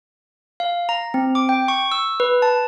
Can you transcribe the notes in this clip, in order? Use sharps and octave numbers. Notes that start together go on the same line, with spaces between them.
F5
A#5
C4
D6
G5
C#6
E6
B4
A5